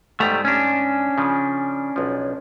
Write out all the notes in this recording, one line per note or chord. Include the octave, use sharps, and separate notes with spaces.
G#2 G3 A3 B3 A#5
C#4 D4
C#3 F3
B1 F3